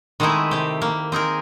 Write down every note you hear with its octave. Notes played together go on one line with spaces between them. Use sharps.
D#3 G#3 A3 C4 D#4 E4
C3 G4
A#3
C4 D#4 G#4 A#4